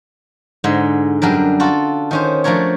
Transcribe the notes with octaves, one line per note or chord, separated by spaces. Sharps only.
G#2 D3 G#3
F#2 G3 D4 A#4
F4 F#4 A4
D#3 C#4 C5
F3 A3 D4 A#4 C#5